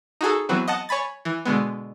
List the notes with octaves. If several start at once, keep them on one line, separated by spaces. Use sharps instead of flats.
D#4 F#4 G#4 A4
E3 F#3 B3 C4
D#5 F#5 A5
C#5 G#5 B5 A6
E3
B2 D3 G#3 B3